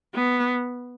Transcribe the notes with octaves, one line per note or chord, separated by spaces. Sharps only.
B3